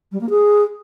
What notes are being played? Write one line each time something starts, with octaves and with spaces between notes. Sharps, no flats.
G3
A#3
G#4